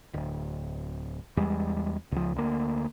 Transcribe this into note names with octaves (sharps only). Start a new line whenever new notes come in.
D1
E2 G3 G#3
C#2 F3
D2 A#3